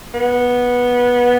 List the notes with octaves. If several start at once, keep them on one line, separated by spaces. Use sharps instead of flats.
B3